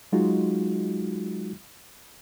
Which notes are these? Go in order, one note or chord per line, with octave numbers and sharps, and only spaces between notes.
F#3 G#3 D#4 F4 F#4